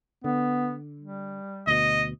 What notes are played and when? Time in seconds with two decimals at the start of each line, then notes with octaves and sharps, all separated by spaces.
0.24 D3 B3
0.99 G3
1.67 D2 B2 D#5